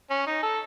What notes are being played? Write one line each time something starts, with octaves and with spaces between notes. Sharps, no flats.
C#4
D#4
A4